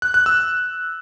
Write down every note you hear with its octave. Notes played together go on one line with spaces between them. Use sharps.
F#6
F#6
E6